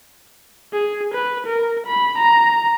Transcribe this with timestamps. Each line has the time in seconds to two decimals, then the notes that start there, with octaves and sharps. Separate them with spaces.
0.73 G#4
1.14 B4
1.46 A#4
1.86 B5
2.18 A#5